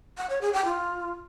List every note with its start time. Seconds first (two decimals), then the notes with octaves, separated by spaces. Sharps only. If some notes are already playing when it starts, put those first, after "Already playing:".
0.18 F#5
0.30 C#5
0.41 G#4
0.53 G5
0.65 F4